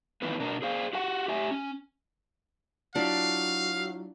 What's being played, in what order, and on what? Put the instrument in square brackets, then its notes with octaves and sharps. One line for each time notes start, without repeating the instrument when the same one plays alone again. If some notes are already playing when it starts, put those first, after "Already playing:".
[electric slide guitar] D#3 E3 B3 D#4 F4 B4
B2 D4 A#4
G#4 C5 F5
F#4 G4 F#5
G4 E5 G#5
C#4
[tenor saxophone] F#3 [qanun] D4 [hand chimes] E4 F4 [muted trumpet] F5